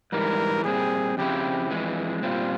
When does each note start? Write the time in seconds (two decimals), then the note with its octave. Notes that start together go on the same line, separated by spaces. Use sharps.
0.12 G#2 E3 G3 A#4
0.64 A#2 G3 C4 G#4
1.17 F2 C#3 F3 C4 E4 G4
1.70 F2 E3 G#3
2.23 A#2 G3 C4 F4